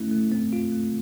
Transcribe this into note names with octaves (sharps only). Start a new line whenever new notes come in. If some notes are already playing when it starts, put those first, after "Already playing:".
Already playing: A3 C#4 E4
A3
C4
F4
A3